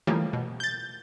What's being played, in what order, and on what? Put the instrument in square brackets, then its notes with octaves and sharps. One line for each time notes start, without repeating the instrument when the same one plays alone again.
[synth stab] C#3 E3 F3 G3 A3 A#3
B2
G6 A6